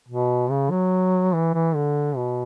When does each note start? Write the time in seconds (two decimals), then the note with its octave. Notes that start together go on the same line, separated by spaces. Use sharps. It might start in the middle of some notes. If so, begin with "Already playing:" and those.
0.09 B2
0.50 C#3
0.71 F#3
1.33 E3
1.54 E3
1.75 D3
2.16 B2